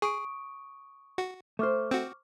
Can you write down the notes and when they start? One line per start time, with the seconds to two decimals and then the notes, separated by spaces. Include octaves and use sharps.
0.02 G#4 C#6 D#6 D7
1.18 F#4
1.59 A3 C5 C#6 D6 F6
1.91 C4 F#4